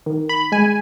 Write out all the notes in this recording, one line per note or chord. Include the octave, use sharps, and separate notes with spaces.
D#3
B5
G#3 G#5